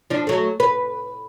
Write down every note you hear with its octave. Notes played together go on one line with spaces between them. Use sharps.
F3 D4
F#3 A3
B4